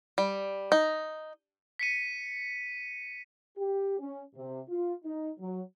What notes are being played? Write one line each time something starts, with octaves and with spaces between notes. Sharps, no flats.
G3
D#4
B6 C#7 D#7
G4
C#4
C3
F4
D#4
F#3